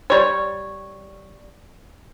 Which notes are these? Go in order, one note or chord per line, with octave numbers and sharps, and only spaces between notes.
G3 C#5